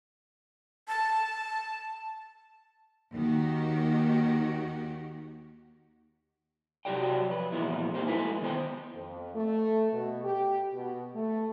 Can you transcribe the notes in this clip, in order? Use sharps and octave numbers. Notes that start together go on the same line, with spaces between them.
A5
D#2 D#3 F#4 G4
C3 F#3 F#4 G4 D5 G5
F3 B4
A#2 E3 F3 G#3 B3 E4
A#2 D#3 G3 A#3 C4 G4
G#3 A3 E4 B4 G#5
D#3 B3 C5 G5
F2
A3
B2
G4
B2
A3